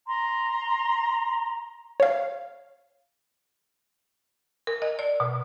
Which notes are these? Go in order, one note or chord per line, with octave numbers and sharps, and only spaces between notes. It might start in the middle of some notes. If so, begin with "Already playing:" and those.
A#5 C6
C#5 F5
A#4
D#5
D5
B2